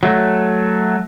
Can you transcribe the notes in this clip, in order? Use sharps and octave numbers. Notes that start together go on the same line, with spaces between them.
F#3 A3